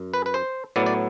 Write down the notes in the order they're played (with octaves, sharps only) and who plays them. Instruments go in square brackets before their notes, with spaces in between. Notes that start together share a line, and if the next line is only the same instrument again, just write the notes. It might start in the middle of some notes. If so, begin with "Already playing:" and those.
Already playing: [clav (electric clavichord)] F#2
B4
B4
C5
A2 F#3 B3 D5
D5